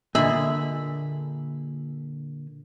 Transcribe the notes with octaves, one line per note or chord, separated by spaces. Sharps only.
A#2 D3 G#4 E5 B5